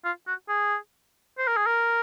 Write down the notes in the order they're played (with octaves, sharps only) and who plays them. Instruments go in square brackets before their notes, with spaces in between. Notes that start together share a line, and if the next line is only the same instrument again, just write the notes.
[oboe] F4
F#4
G#4
C5
A#4
G#4
A#4